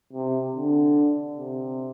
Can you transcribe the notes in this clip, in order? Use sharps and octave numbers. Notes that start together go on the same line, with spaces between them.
C3
D3
C3